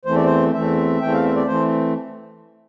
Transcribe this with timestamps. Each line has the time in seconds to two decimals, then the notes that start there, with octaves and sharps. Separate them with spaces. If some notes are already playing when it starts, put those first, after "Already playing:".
0.05 E2 E3 A3 C4 C5
0.16 D5
0.25 C5
0.53 E2 E3 A3 C4 E5
1.00 E2 E3 A3 C4 G5
1.13 F5
1.24 E5
1.36 D5
1.47 E3 A3 C4 C5